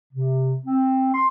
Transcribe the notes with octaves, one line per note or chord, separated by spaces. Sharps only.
C3
C4
C6